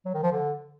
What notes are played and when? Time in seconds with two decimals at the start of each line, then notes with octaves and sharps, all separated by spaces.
0.06 F#3
0.14 D#3
0.23 F3
0.32 D3